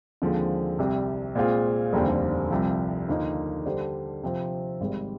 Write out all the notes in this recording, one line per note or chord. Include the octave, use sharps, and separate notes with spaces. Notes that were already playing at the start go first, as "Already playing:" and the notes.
D#2 D3 F3 G#3 C4
C2 C3 G3
A#2 G#3 C4 F4 G#4
F1 D#2 D3 G3 C4
C2 C3 F3
D#2 D3 F3 A#3 D#4
D3 G3 D4 G4 C5
C3 F3 C4
G#1 G#2 G3